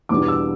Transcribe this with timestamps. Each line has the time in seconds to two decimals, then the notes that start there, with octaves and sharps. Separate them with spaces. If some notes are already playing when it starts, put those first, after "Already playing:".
0.09 E2 B2 G3 B3 D4 D6
0.28 E6